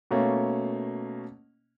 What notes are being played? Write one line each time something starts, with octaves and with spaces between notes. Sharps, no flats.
B2 A3 A#3 C#4